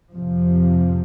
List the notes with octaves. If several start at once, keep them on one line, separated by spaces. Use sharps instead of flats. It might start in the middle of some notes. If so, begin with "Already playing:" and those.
F2 C3 F3